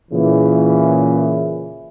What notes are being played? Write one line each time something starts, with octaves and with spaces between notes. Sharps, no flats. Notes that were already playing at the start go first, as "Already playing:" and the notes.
A#2 C#3 E3